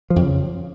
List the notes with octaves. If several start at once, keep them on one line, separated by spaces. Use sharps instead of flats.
F3
F2
C#3